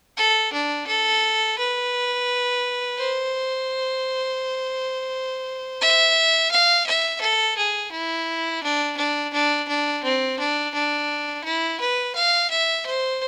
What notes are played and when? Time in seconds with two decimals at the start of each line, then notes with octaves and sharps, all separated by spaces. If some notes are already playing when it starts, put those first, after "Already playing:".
0.17 A4
0.53 D4
0.87 A4
1.59 B4
2.98 C5
5.81 E5
6.51 F5
6.87 E5
7.21 A4
7.57 G#4
7.92 E4
8.63 D4
8.97 D4
9.34 D4
9.68 D4
10.04 C4
10.39 D4
10.74 D4
11.44 E4
11.80 B4
12.15 F5
12.51 E5
12.86 C5